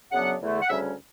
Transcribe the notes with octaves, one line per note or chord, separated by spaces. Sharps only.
F#2 C#3 F#3 B3 D4 F#5
E2 D3 A3
F#5
D2 C#3 G3 C#4 E5